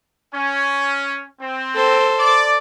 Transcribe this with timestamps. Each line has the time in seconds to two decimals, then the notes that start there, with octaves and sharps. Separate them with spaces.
0.34 C#4
1.40 C4
1.75 A4 C5
2.18 D5